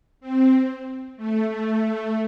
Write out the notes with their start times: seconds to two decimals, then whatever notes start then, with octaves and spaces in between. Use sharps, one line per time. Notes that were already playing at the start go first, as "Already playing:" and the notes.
0.21 C4
1.17 A3
1.49 A3